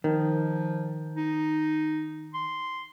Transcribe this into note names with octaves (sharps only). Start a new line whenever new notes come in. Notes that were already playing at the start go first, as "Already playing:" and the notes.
D#3 F3
D#4
C6